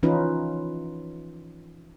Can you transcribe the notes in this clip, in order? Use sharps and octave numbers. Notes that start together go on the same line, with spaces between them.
E3 F3 C#4 D#4 F4 B4